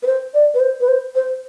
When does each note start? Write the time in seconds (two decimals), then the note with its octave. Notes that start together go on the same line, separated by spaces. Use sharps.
0.03 B4
0.07 C5
0.34 D5
0.54 B4
0.60 C5
0.81 B4
0.88 C5
1.15 C5